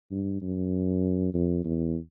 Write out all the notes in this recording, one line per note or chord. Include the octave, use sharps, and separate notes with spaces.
G2
F#2
F2
E2